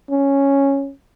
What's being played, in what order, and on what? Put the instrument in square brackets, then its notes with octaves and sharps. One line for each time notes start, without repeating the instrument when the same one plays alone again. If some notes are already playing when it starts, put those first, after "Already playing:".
[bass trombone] C#4